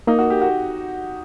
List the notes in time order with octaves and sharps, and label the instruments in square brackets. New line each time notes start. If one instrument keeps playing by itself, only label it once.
[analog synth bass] A#3 [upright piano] D#4
[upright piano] F#4
G4
F#4